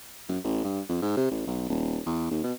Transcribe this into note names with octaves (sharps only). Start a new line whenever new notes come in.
F#2
A1
G2
F2
G#2
C3
A1
B1
D#1
E2
D#2
B2